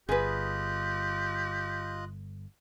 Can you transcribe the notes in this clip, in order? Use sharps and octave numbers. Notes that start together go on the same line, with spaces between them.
G1 F4 G4 G#4 B4 D#5 F#6